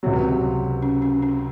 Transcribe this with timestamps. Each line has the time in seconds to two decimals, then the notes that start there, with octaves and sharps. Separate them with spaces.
0.03 C#2 C3 F#3 C4
0.82 C#4
1.02 C#4
1.22 C#4